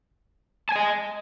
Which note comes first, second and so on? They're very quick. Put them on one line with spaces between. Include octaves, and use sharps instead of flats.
A5 G#5 D#5